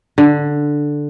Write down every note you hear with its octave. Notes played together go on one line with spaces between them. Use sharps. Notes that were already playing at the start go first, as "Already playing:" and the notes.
D3